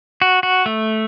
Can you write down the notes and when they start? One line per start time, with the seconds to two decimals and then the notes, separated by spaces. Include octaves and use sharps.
0.22 F#4
0.43 F#4
0.66 A3